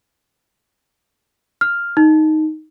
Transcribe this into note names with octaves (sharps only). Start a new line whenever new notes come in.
F6
D#4